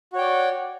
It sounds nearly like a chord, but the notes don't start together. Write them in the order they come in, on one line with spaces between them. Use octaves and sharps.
F#4 C#5 G5 D5